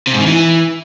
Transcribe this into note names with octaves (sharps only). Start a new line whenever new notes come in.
C3
G#2
D#3
E3